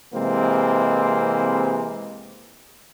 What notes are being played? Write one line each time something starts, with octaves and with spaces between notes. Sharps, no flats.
C3 E3 G#3 A#3 C4